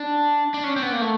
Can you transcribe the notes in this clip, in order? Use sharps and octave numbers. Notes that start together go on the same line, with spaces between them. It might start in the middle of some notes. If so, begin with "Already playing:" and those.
Already playing: D4
D4
C#4
C4
B3
A#3
A3